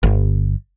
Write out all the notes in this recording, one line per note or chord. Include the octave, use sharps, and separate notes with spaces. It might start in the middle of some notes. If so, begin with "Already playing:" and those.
G1